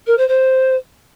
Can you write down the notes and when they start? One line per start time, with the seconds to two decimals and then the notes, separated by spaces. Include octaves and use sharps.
0.06 A#4
0.17 C5
0.28 C5